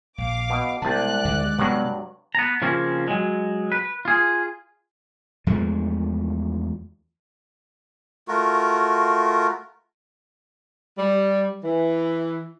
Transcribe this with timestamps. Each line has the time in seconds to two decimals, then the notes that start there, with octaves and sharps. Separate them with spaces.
0.18 A#1 F5 D6
0.50 B2
0.82 C2 B2 G#3 D5 A5 F#6
1.25 D2 D3 D#3
1.59 G2 C3 F#3 B3
2.35 B3 A#5
2.62 C#3 F3 A#3 C4 C#4
3.08 F#3 G#3
3.72 B4
4.05 F4 G#4
5.47 E2 F3 G#3 A3
8.28 A3 F4 F#4 A#4
10.98 G3
11.64 E3